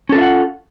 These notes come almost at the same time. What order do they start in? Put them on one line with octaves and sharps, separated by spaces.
C#4 A4 F4 E5 F#5